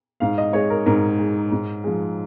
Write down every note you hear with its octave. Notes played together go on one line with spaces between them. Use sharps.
G#2 F5
D#5
G#3 C#5
A#4
G#2 A#4
G#3
G#2
F3 G#3